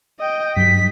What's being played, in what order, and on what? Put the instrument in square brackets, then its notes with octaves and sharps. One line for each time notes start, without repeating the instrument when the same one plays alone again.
[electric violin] D#5 G5
[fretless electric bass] G2 F#3 [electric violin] B6